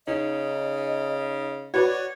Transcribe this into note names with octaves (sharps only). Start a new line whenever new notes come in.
C#3 D#4 D#5
F#4 B4 C#5 D5